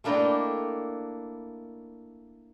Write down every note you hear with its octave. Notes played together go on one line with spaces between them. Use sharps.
A3 A#3 D4 E4 D#5 G5